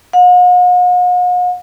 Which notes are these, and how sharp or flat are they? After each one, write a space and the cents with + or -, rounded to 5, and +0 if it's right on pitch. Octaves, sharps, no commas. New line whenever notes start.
F#5 -45